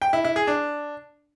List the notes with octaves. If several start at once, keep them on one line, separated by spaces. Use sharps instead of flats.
G5
E4
E4
G#4
D4